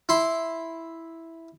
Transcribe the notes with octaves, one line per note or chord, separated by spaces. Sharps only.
E4 C6